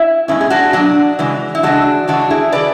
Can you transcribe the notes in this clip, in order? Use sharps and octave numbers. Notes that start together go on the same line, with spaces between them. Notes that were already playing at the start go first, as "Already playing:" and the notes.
Already playing: E4
B2 G#3 C#4 E4
G#4
D4 F#4
B2 F#3 D4 F#4
C#3 E3 G#3
E4
C#3 E3 G#3 D4 F#4
C#3 E3 G#3 D4 F#4
E4 G#4
C#3 E3 B4 D5